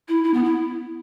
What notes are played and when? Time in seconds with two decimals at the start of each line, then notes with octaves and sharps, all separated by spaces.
0.08 E4
0.24 E4
0.34 B3
0.44 E4